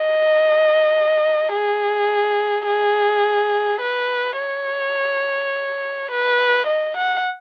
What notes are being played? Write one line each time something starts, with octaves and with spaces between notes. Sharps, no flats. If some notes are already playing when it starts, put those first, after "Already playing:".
Already playing: D#5
G#4
G#4
B4
C#5
B4
D#5
F#5